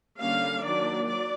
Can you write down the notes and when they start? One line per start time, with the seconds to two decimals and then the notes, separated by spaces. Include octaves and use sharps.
0.18 D3 G3 A#3 C#4 F5
0.61 D#3 F#3 A#3 D4 D5
1.05 F#3 D5